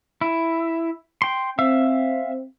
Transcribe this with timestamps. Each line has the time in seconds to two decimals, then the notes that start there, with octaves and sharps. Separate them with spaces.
0.21 E4
1.22 G5 C6
1.59 C4 E5 F5 E6